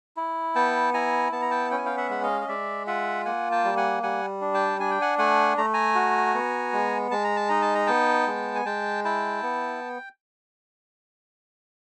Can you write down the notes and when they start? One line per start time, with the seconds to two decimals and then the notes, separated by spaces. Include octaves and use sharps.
0.17 E4
0.55 B3 G5 A5
0.94 E4 G#5 A#5
1.32 B3 A5
1.42 A#5
1.51 G5 A5
1.71 C#4 G5
1.78 G#5
1.85 F5 G5
1.97 E5 F#5
2.10 G#3 F#5
2.23 D#5 F5
2.41 D#5
2.48 G#3 D5 E5
2.87 F4 E5 F#5
3.25 A#3 F#5 G#5
3.51 G5 A5
3.64 G3
3.77 F#5 G#5
4.03 G3 F#5 G#5
4.41 D4
4.54 G5 A5
4.79 D4 G#5
4.91 G5
5.01 F#5 G#5
5.18 A3 F#5 G#5
5.58 A3 A#5
5.73 G#5 A#5
5.95 F#4
6.34 B3
6.73 G#3
7.11 G#3 A5
7.24 A#5
7.36 A5
7.49 D#4 A#5
7.62 A5
7.75 A#5
7.87 B3 G5 A5
8.27 G#3
8.55 G#5
8.65 G#3 G5 A5
9.05 E4 G5 A5
9.43 B3